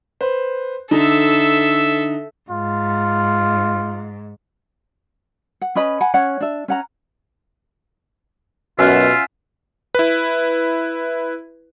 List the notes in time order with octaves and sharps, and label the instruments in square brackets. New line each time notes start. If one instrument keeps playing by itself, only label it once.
[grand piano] B4 C5
[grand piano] D3 D#4 [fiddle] A4 E5
[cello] G#2 [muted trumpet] F4
[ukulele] F#5
C#4 B4 D#5 B5
F#5 G#5 B5
C#4 C#5 F#5
D4 E5
C#4 F#5 A#5
[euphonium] F#2 [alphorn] B2 [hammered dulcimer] C#4 E5 F#5 [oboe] F4
[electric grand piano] E4 B4